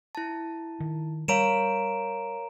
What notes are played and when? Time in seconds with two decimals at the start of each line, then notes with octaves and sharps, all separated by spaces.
0.15 E4 A5
0.80 D#3
1.28 G3 A#4 C#5 F5 A#5 D7 E7